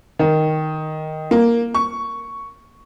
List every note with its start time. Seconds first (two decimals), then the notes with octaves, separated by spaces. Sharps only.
0.19 D#3
1.31 A#3
1.75 C#6